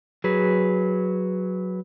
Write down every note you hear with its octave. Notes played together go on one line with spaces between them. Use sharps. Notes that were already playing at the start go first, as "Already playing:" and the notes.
F#3 G#4 B4